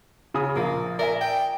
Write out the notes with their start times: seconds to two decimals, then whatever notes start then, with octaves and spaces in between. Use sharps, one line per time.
0.34 C#3 G#5 D#6
0.56 A#1 A#3
0.99 A#4 D5 E5 G#5
1.21 G5